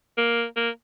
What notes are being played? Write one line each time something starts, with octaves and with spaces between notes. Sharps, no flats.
A#3
A#3